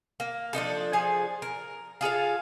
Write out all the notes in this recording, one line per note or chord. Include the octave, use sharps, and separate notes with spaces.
A#3
F3 D4 D#4 A4
F3 G#4 G#5
A#4
F4 G#4 A4 F5